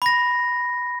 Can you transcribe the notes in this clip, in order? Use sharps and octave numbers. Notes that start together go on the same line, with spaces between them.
B5 A#6